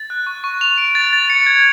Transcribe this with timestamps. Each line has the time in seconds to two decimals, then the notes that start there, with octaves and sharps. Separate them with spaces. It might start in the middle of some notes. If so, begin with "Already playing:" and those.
Already playing: A6
0.10 F#6
0.27 C#6
0.44 C#6
0.61 F7
0.78 D7
0.95 A6
1.13 A6
1.30 C#7
1.46 G#6